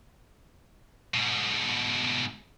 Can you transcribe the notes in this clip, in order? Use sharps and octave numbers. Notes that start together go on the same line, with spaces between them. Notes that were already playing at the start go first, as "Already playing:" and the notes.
G#2 B2